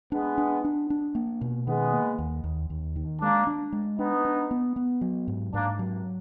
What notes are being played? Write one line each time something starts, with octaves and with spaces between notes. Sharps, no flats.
G#3 B3 D4
D4
D4
D4
A#3
B2
D#3 G#3 B3
A#3
D#2
D#2
D#2
D#3
G#3 A#3 D4
D4
G#3
B3 D4 D#4
D4
B3
B3
F#3
G#2
G#2 A#3 D4
F#3